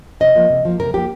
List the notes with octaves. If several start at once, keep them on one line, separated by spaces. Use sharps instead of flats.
C3 D#5
F3 A#3
C3
F3 A#3
C3 A#4
F3 A#3 G4